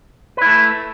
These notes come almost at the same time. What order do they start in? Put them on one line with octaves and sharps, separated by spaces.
B4 E4 A3